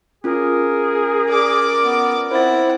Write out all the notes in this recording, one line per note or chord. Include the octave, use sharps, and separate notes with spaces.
C#4 F4 G#4 A#4
D5 D6
B3
C4 E4 C5 F#5 A6